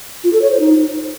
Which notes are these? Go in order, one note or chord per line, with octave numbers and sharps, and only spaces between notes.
F4
A4
C#5
C5
D#4